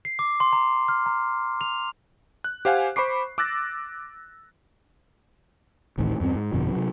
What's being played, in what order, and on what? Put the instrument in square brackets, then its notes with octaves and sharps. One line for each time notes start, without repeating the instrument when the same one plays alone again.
[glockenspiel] C7
D6
C6
A#5
F6
A#5
F7
[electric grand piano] F#6
G4 C5 F5 F#5 G#5
C5 B5 C#6 D6 C7
D6 E6 F#6 A6 A#6
[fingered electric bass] D1 A1 A2 D#3
E2 G2 G#3 C4
G#2
G1 F2 B2 D3
C3 F#3